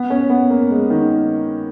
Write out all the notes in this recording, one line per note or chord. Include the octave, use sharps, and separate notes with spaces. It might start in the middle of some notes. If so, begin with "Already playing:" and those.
Already playing: B3
C#4
B3
A#3
G#3
D#3